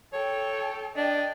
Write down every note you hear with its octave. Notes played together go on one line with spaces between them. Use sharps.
A4 C#5 G5
D4 D#5 G5